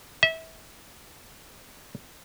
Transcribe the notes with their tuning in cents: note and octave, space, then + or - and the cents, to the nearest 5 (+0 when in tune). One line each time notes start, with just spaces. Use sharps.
E5 -25